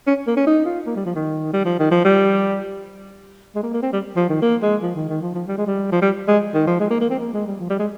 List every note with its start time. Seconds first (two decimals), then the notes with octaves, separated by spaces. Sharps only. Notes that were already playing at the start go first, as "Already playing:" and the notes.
0.07 C#4
0.27 A#3
0.37 C#4
0.47 D#4
0.66 F4
0.86 A#3
0.96 G3
1.05 F3
1.16 D#3
1.53 G3
1.65 F3
1.79 D#3
1.91 F3
2.05 G3
3.56 G#3
3.63 A#3
3.73 A#3
3.83 C4
3.93 G3
4.16 F3
4.30 D#3
4.42 A#3
4.62 G#3
4.82 F3
4.96 D#3
5.09 D#3
5.21 F3
5.34 F3
5.48 G3
5.58 G#3
5.67 G3
5.92 F3
6.02 G3
6.28 G#3
6.54 D#3
6.67 F3
6.80 G#3
6.90 A#3
7.01 A#3
7.10 C4
7.19 A#3
7.33 G#3
7.46 G3
7.60 F3
7.70 G3
7.79 G#3